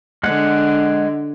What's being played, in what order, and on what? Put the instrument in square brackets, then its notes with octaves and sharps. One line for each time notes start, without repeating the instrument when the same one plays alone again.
[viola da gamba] D3 [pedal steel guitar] G#3 F#5